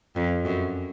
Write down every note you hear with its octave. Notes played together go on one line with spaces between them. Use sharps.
F2
F#2